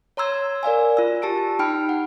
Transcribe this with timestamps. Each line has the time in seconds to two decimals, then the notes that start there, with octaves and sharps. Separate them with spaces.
0.17 C#5 A#5 C6 E6 G#6
0.63 A#4 D5 F5 G#5
0.97 F4 E6
1.22 G4 A5 E6 D7
1.59 D#4 G5 B5 F6 D7
1.89 F#5